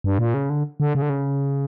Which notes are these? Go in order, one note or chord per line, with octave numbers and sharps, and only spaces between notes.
G2
A#2
C#3
D3
D3
C#3
D3
C#3